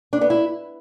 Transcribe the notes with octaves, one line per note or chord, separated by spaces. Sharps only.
D4
B3
E4